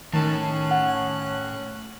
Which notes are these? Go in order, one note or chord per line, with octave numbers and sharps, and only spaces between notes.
A2 D#3 C#4 A5 F#6
F#5